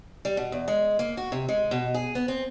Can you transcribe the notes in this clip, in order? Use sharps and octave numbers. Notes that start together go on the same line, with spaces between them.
G3
B2
E2
G#3
A#3
F#4
C3
G#3
B2
G#4
B3
C4